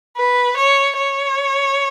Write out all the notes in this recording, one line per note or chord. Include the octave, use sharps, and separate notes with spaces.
B4
C#5
C#5